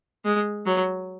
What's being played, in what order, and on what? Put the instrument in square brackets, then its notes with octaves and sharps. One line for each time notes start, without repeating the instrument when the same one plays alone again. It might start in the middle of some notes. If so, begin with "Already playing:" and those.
[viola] G#3
F#3